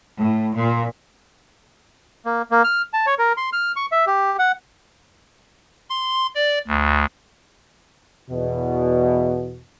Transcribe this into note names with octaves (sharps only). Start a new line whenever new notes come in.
A2
A#2
A#3
A#3
F6
A5
C#5
A#4
C6
F6
C#6
E5
G4
F#5
C6
D5
D2
E2 B2